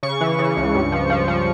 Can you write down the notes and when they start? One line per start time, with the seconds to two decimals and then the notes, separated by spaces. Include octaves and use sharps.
0.03 C#3 C#6
0.21 E3
0.39 C#3
0.57 C#2
0.75 G2
0.92 F3
1.10 F3
1.28 F3